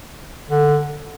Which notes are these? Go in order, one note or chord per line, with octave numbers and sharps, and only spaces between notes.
D3